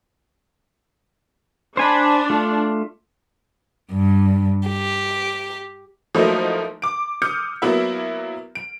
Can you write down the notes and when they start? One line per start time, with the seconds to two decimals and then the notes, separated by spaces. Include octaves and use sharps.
1.77 D4 C5 G#5 B5
2.30 A3 F4
3.91 G2
4.67 G4
6.14 F3 F#3 A3 A#3 D#4 E4
6.82 D6 D7
7.22 D6 D#6 F6 G6 C#7
7.62 F#3 A#3 B3 E4 E5
8.55 D7